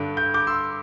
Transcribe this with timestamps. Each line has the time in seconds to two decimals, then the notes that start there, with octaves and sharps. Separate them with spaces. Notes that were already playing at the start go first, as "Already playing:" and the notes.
Already playing: G2 D3
0.17 G6
0.34 D6 G6
0.47 C6 E6